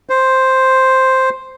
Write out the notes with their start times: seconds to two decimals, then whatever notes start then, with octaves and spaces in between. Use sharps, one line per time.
0.09 C5